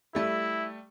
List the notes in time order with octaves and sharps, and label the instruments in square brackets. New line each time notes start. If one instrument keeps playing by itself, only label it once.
[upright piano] G3 A3 [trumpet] E4